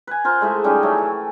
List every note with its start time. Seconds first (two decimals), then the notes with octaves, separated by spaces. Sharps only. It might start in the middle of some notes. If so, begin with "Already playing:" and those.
0.07 B4 G#5
0.24 F4 A#4 C5 F#5
0.41 G#3 A3 E4 E5
0.64 F3 G3 C#4 D#4
0.83 F#3 A3 E4
0.98 E3